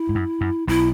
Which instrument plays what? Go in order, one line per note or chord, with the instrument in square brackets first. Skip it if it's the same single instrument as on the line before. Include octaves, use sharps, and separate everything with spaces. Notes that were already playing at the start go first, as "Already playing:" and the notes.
Already playing: [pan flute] E4
[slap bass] G#2
F#2
F#2
[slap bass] B1 B2 [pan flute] E4